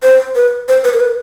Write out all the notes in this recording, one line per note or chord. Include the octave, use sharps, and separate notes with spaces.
C5
B4
C5
B4
A#4
B4